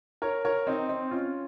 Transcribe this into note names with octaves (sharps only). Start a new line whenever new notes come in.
A#4 C#5
A#4 C#5
C4 D#4
C4 D#4
C#4 F4